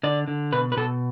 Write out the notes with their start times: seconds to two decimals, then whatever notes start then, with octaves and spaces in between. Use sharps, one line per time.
0.03 D3 D5
0.28 D3
0.53 B2 B4
0.72 B4
0.77 B2 A4